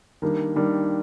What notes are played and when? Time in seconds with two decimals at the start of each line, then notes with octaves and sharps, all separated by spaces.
0.22 D#3 G3 A#3 D4
0.56 D#3 G3 A#3 D4